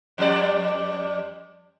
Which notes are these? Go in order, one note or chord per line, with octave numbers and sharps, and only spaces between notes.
F2 G3 D5